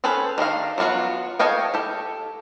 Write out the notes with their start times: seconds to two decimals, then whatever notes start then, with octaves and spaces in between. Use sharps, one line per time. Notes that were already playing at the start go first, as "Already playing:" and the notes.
0.04 C#4 G#4 A4 B4 C5
0.38 D#3 D4 D#5 F5
0.78 F#3 B3 D4 F4 F#4
1.39 A4 C#5 D#5 F5 G5
1.74 G4 A4